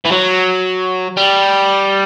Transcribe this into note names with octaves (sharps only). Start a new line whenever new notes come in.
E3
F#3
G3